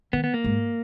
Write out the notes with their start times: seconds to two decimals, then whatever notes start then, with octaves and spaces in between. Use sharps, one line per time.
0.13 D#3 B3
0.24 B3
0.34 A#3
0.44 G#2